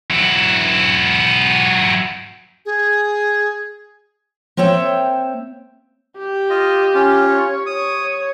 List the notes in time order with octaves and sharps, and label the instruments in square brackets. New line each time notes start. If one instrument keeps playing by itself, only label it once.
[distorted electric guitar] F#3 E4
[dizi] G#4
[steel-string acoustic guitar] A#3 C4 C#5 E5 G5
[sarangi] G4
[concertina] F4 D#5
C#4 F4
[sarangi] C#5
[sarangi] C#5 [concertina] D#6